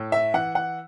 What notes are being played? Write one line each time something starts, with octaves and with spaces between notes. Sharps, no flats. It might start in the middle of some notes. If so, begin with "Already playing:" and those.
Already playing: A2
E5
E3 F#5
F#5